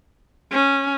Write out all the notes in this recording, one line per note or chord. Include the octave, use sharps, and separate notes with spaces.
C#4